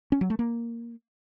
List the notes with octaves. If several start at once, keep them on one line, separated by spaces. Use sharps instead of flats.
C#4
F#3
A3
A#3